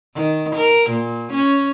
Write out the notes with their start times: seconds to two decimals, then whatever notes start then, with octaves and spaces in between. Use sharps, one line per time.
0.15 D#3
0.56 A#4
0.91 A#2
1.33 C#4